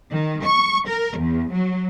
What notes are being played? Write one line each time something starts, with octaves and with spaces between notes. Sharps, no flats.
D#3
C#6
A#4
E2
F#3